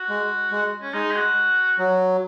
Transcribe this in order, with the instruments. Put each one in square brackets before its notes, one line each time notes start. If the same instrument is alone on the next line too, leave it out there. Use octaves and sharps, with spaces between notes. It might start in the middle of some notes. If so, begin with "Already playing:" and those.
Already playing: [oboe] F#4
[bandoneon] G#3
G#3
[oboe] C#4
[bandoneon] G#3 [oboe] D#4
[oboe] G#4
F#4
[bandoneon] F#3